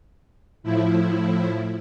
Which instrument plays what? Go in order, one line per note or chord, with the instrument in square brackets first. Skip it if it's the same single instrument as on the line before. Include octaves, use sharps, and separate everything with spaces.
[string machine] A2 F3 E4